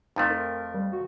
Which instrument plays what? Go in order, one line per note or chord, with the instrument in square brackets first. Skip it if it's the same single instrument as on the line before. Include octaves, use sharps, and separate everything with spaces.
[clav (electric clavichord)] F2 F3 A3 [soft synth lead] D#4
[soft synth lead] A#4
G3
F#4